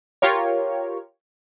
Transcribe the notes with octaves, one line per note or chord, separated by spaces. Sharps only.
F4 G4 A#4 C#5